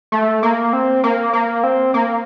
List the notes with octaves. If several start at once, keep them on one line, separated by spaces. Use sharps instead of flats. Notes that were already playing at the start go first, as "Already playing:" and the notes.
A3
A#3
C4
A#3
A#3
C4
A#3